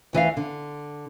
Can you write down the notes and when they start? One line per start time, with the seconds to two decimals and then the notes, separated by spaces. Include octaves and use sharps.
0.13 D2 E3 D#5 F5
0.37 D3